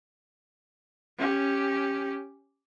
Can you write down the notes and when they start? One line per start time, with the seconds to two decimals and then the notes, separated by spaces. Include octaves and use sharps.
1.18 C#4 G4